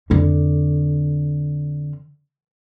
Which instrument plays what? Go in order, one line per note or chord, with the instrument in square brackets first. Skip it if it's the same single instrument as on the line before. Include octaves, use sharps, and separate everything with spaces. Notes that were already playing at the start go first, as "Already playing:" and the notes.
[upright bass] F2 D3